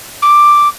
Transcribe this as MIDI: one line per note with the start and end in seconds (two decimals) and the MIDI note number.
0.22 0.68 86